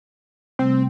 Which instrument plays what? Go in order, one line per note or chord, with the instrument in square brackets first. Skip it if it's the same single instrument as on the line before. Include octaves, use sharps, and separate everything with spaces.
[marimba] C3 G3 A3 [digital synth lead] C4